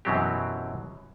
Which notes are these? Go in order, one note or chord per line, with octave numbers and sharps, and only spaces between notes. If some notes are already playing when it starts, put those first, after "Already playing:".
F#2 B2 E3 F#3 C4 G4